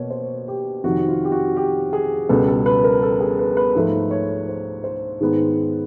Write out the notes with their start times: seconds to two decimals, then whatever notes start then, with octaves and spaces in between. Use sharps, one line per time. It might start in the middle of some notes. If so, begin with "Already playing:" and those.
Already playing: B2 A#3 C#5
0.10 C5
0.48 G4
0.84 F2 C3 D#3 F#4
1.08 F4
1.25 G4
1.32 F#4
1.57 G4
1.93 G#4
2.29 C#2 B2 G3 B3 A4
2.48 A4
2.66 B4
2.84 A#4
3.02 A4
3.20 G#4
3.39 B4
3.57 B4
3.75 G#2 F3 A3
4.11 C#5
4.48 C5
4.84 C5
5.20 G#2 D#3 G#3 B3